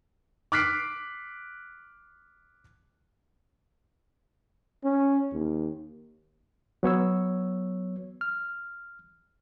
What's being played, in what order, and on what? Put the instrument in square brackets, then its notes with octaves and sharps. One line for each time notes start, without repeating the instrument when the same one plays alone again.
[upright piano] D6 F6 F#6 B6 C7 D7
[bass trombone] C#4
D#2
[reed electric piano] F#3 B3 C#5 E6
F6